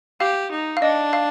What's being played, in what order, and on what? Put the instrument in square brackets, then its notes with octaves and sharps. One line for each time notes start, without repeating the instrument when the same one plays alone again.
[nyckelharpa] G4 [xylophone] F5
[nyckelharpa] D#4
[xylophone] F5
[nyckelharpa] D4 [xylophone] D#5
[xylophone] F5